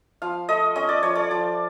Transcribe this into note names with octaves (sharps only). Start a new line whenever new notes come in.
F3 F5
A3 D#5
C#4 D#5
D5
F3 C#5
D5
F3